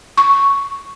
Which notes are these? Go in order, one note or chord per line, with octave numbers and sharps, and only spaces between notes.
C#6